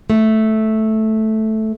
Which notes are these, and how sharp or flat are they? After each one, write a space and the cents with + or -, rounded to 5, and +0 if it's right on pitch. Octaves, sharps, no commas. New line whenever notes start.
A3 -5